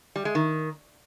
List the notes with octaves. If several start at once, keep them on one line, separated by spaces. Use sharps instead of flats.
G3
G#3
D#3